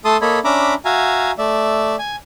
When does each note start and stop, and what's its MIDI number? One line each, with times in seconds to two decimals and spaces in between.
0.05 0.17 57
0.05 0.17 69
0.05 0.17 81
0.05 0.17 84
0.05 0.17 87
0.21 0.39 58
0.21 0.39 69
0.21 0.39 73
0.21 0.39 75
0.21 0.39 83
0.44 0.74 61
0.44 0.74 62
0.44 0.74 76
0.44 0.74 82
0.44 0.74 83
0.44 0.74 86
0.85 1.32 66
0.85 1.32 76
0.85 1.32 77
0.85 1.32 80
0.85 1.32 82
1.38 1.96 57
1.38 1.96 74
1.38 1.96 76
1.99 2.16 80